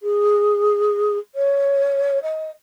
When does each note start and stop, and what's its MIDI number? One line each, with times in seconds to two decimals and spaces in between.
0.02 1.18 68
1.35 2.21 73
2.22 2.50 75